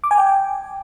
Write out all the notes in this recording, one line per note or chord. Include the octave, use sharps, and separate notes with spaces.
D6
G#5
G5